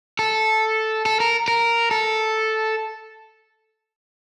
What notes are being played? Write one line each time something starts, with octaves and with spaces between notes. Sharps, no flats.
A4
A4
A#4
A#4
A4